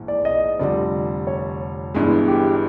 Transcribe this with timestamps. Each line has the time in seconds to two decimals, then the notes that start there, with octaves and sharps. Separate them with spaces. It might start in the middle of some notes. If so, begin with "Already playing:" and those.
Already playing: A#1 G#2 E3
0.08 D5
0.25 D#5
0.59 F1 F2 D3 G3 D5
1.27 C#5
1.94 G1 G2 E3 G#3
2.28 G4